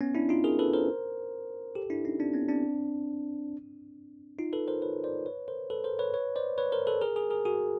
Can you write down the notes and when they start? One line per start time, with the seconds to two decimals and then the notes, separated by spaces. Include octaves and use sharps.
0.01 B3 C#4
0.15 D4 E4
0.29 D#4 F4
0.44 G#4 A#4
0.59 A4 B4
0.73 A#4 C5
1.75 G4 A4
1.90 D4 E4
2.05 C#4 D#4
2.20 C4 D4
2.34 B3 C#4
2.48 C4 D4
4.39 D#4 F4
4.53 A4 B4
4.68 A#4 C5
4.82 B4 C#5
5.04 C5 D5
5.26 B4 C#5
5.48 A#4 C5
5.70 A4 B4
5.84 A#4 C5
5.99 B4 C#5
6.14 B4 C#5
6.36 C5 D5
6.58 B4 C#5
6.72 A#4 C5
6.87 A4 B4
7.02 G#4 A#4
7.16 G#4 A#4
7.30 G#4 A#4
7.45 F#4 G#4